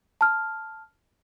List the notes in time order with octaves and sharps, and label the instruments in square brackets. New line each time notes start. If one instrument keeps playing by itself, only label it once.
[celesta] A5 F6